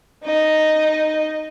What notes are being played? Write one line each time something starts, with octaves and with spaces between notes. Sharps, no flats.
D#4 D#5